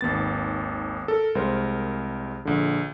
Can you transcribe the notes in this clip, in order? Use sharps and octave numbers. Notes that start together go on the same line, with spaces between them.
G#1 D#2 B3 A6
A4 A#4
C2 G#3 A#4 C5
A#1 D3